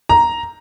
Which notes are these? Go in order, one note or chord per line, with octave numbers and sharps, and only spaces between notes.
A#5